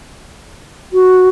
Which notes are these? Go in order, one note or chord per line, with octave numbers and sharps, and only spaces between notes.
F#4